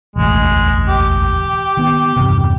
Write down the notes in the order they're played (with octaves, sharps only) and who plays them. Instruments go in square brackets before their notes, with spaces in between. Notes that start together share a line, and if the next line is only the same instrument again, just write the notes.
[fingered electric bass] E1 A1 D2 [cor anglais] G#3
[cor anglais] G4
[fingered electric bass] D#3 B3
E2 G2 C3